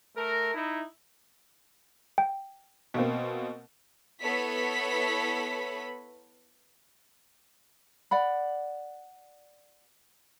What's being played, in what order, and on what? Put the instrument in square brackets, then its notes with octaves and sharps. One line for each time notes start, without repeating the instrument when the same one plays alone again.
[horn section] A3 A#4
D#4 E4
[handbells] G5
[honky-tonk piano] B2 A#3 C4
[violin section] B3 E4 A4 C#5 B5 B6
[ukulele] D5 F#5 B5